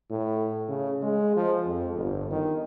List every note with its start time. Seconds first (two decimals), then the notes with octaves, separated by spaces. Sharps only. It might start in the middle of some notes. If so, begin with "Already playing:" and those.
0.10 A2
0.69 C#3
1.02 G#3
1.36 F3
1.66 F2
1.96 G1
2.31 D#3